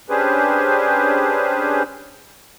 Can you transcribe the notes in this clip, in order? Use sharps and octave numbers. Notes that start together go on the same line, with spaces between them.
C#4 D4 G4 G#4 B4 C5